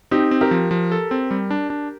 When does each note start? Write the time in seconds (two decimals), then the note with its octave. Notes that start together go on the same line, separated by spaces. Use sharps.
0.11 C4 D#4 G4
0.31 C4
0.41 G4 A#4
0.51 F3
0.71 F3
0.92 A4
1.11 C4
1.31 G3
1.51 D4
1.70 D4